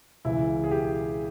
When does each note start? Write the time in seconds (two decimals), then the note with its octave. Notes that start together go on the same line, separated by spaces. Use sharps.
0.25 C#2 C#3 E3 E4
0.64 G#4
0.71 G4